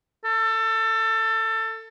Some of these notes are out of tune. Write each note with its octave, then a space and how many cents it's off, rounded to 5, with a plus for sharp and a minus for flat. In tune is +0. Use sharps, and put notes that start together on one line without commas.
A4 +20